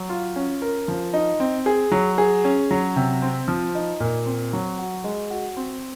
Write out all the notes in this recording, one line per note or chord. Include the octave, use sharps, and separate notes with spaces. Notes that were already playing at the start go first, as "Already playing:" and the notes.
Already playing: F#3
F4
C#4
A#4
F3
D#4
C4
G#4
F#3
G#4
C#4
F#3
C3
C4
F3
D#4
A#2
C4
F#3
F#4
G#3
F#4
C4